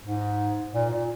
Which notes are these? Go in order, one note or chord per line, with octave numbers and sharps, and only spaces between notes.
G#2
A#2
A#2